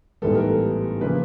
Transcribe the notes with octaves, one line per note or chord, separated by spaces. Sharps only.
A1 G#2 E3 G3 B3 A4
A#4
A4
C#3 F3 A#3 B4